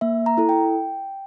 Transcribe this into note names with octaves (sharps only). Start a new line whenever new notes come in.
A#3 E5
A#5
E4 A4
G5